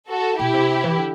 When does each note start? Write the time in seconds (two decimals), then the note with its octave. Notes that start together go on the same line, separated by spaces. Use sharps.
0.09 F#4 A4
0.39 B2 E4 G4
0.54 C3
0.84 E3
0.97 D3